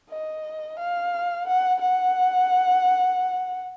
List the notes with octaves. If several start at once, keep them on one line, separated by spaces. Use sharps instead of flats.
D#5
F5
F#5
F#5